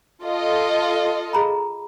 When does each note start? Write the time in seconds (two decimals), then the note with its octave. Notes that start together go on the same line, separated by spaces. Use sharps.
0.23 F4 A4 D#5
1.33 G#4 A#5 B5